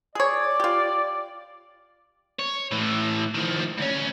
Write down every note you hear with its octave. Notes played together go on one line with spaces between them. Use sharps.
G#4 C#5 D5
F4 G4
C#5
A2 E3
D#3 F3
D2 C#4